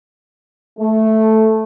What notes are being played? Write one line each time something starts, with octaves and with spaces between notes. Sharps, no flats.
A3